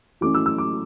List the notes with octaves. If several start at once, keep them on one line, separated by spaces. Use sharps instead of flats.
E3 A3 C#4 D6
E6
E6
D6